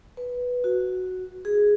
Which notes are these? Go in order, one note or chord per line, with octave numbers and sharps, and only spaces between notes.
B4
F#4
G#4